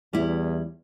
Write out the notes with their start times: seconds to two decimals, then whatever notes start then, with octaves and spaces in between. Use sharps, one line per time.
0.13 E2 G3 E4